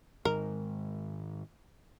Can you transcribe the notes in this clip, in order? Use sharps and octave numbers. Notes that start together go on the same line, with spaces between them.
G#2 D#3 G#3 A#4